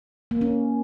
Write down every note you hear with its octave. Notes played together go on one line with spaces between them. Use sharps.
A#3
C#4